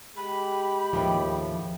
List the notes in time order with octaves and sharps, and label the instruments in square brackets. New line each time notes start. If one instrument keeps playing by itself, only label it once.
[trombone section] G#3 G4 [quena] B5
[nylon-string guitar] D#2 A2 G5 [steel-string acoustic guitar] F3